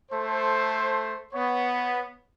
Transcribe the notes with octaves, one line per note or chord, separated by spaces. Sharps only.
A3 A4 C5
B3 C#5